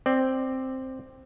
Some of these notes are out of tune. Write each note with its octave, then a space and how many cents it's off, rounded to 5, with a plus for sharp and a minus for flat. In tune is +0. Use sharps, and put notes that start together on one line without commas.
C4 +0 D5 +10